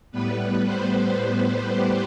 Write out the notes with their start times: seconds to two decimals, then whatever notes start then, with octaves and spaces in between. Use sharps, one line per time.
0.12 A2 G3 B3 B4
0.65 C5
1.19 B4
1.72 G4